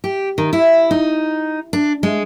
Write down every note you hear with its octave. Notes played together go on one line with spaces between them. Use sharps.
G4
D#3
E4
D#4
D4
G#3